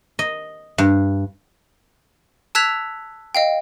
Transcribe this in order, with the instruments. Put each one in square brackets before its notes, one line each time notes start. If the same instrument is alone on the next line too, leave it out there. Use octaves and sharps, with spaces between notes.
[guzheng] D#5
G2
[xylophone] A5 E6 F#6 G#6 B6 F7
D#5 F5 G5